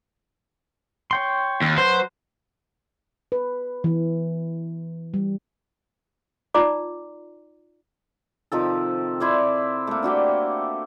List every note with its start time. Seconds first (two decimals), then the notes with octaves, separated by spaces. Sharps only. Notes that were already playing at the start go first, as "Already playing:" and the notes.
1.11 C#5 G5 C6
1.62 D#2
1.78 F#3 B4 C5
3.32 B4
3.84 E3
5.14 G3
6.54 D#4 F4 D5 A#5 D6
8.52 C3 D#3 F3 A4
9.20 E4 C5 D5
9.87 A3 A#3
10.03 D4 F#4 G4 G5